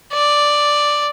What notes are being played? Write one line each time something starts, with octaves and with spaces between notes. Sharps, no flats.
D5